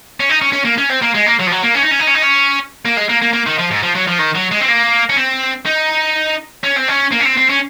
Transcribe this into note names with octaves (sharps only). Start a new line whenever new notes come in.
C#4
D#4
C#4
C#4
A#3
C#4
C4
A#3
G#3
A#3
F#3
F3
F#3
A#3
C#4
D#4
C#4
D#4
C#4
D#4
C#4
A#3
G#3
A#3
A#3
A#3
D#3
F3
G#2
F3
F#3
F3
D#3
F#3
G#3
C4
A#3
C#4
C4
D#4
C#4
C4
C#4
A#3
C#4
C4
C4
C#4